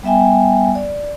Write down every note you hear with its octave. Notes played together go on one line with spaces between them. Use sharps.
G3 B3 E5 G5 G#5
D5